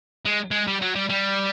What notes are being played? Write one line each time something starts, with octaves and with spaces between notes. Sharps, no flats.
G#3
G#3
G3
F#3
G3
G3